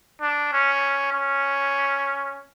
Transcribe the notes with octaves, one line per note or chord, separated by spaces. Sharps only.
D4
C#4
C#4